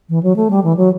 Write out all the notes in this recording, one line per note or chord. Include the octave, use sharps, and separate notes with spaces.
E3
F#3
A3
G3
E3
F#3